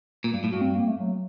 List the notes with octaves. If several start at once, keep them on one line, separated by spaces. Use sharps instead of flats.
A#2
G2
A2
G2 F#4
C4
A#3
A3
F#3